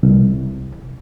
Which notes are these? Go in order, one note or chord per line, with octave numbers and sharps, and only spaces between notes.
C2